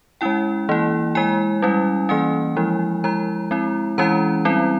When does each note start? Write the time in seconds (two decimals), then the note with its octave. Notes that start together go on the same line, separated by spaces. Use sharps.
0.21 G#3 C#4 E4 G5
0.69 E3 A#3 E4
1.15 G#3 E4 G#5
1.62 G3 C#4 E4
2.09 E3 A#3 C#4 G#5
2.56 F3 G#3 E4
3.04 F3 G#3 E4 A#5
3.51 G#3 C4 E4
3.98 E3 G#3 C#4 E4 A#5
4.45 G3 C4 E4